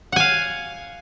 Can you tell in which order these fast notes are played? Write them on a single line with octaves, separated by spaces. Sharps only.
F#5 G#5 F5